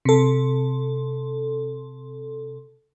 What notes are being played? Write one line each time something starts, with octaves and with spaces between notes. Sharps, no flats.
C3 A4